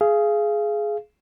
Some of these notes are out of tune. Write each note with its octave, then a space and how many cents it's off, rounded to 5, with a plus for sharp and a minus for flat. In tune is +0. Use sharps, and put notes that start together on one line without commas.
G#4 +15 F5 -25